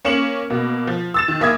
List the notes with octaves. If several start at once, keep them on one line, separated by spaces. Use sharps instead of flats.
A#3 C#4 C#7 E7 F#7
B2 A#3
F3
E6 A6 E7
D#3
F#1 A#3 E5 D#6 G#6